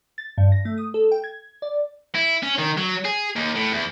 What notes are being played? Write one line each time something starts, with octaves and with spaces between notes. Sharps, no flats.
A6
G2
A#6
A3
D#6
A4
G5
G#6
D5
E4
C#4
D#3
F#3
G#4
D#2
A2
E2